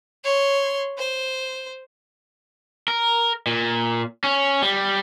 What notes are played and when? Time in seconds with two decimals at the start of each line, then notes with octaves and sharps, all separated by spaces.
0.24 C#5 C6
0.98 C5
2.88 A#4
3.47 A#2
4.24 C#4
4.62 G3